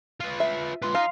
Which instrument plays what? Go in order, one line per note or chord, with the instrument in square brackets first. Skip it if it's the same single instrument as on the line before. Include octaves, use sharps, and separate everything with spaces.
[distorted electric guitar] F4 B4
[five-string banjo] E5
[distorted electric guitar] F4 B4 [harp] C6
[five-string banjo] F4 [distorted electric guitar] D#5 A#5 [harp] F5